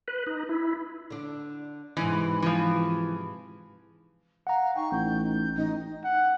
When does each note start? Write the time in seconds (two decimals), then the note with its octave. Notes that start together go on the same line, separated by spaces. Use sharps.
0.08 B4
0.27 D#4
0.49 E4
1.10 D3 D4
1.97 G#2 C3 E3 D#4
2.42 E3 F3
4.47 F5 F#5 A#5
4.76 D#4 G5 C#6
4.91 A1 G6
5.57 A1 D#4 D#5
6.04 F#5